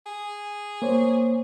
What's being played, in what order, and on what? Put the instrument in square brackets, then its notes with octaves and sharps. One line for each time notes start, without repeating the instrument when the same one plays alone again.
[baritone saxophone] G#4
[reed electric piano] A#3 C5 C#5